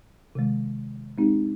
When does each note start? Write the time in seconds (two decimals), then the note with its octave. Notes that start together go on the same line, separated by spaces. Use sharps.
0.35 C3 D#3 G#3
1.18 G#3 C4 D#4 G4